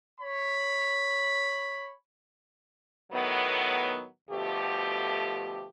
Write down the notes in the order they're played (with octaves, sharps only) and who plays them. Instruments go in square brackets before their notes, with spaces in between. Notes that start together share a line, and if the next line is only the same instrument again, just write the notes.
[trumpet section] C#5 B5
[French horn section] A2 D#3 F#3 B3
D2 B2 F3 A3 G4